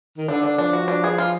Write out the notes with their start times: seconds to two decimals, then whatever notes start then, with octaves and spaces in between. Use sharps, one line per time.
0.18 D#3
0.28 D3 D4
0.43 D4
0.58 F3 D4
0.73 F#4
0.88 D4
1.04 G#4
1.18 F4